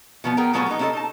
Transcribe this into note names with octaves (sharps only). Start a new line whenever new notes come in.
B2 F3 B3
B3 G#4 A#4 G5 A#5
A#2 F#3 A3 B3 F4 G#4
B3 D#4
A#3 C#4 E4 G#4 A4 D#5
D#4 A5